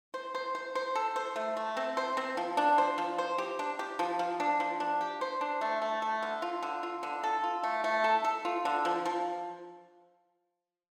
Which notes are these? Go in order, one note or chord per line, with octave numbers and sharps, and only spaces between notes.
C5
C5
C5
C5
A4
C5
A3
A3
C4
C5
C4
F3
D4
C5
F3
C5
G4
D4
G4
F3
F3
D4
F3
D4
G4
C5
D4
A3
A3
A3
D3
F4
D3
F4
D3
A4
F4
A3
A3
A4
A4
F4
D3
F3
F3